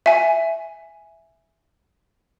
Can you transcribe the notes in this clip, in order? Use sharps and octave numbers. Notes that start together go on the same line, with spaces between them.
E5 G#5